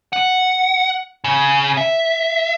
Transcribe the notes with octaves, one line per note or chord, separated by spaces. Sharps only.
F#5
C#3
E5